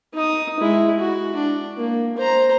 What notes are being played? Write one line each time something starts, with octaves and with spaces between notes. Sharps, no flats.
D#4 D#6
G#3 E4
F#4
D4
A#3
C5 A#5